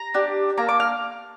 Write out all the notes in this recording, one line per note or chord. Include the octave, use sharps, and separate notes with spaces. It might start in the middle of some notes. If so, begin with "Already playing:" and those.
Already playing: A#5
D4 G4
A#3 D4 A4 A#5
D6
F6